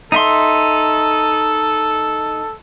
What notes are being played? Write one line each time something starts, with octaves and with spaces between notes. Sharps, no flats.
D#4 A4 E5 C6